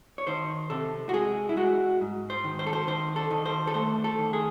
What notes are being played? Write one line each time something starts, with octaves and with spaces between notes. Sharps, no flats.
C#5
D#3 C5
C3 A4
F#4
G#3 G#4
E4
G#3 F#4
G#2
C5
D#3
C5
A4
C5
D#3 C5
A4
D#3
C5
A4
A3 C5
A4
D#3
G#4